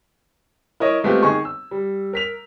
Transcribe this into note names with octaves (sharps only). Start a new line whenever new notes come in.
E4 A#4 C#5 D#5
G#3 A3 B3 C4 F4 G4
D#3 G#4 C#6
E6
G3
A#4 B6 F7